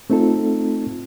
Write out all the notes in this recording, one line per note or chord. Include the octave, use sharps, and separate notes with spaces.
A3 C4 D#4 F4 A4